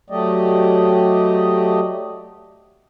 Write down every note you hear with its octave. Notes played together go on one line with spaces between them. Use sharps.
F#3 A3 G4 D5 D#5